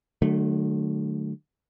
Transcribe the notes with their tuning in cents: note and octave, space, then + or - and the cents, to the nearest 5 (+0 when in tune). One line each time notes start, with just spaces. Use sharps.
D3 +45 F#3 +10 A3 -15